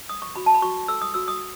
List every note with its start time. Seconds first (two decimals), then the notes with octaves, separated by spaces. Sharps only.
0.09 D#6
0.22 C#6
0.36 F#4 B5
0.46 A5
0.54 B5
0.62 F#4 C#6
0.88 A4 E6
1.02 D#6
1.14 F#4 E6
1.28 D#6